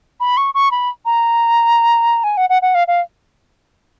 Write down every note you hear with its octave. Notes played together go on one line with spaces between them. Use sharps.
B5
C#6
C#6
B5
A#5
G#5
F#5
F#5
F#5
F5
F5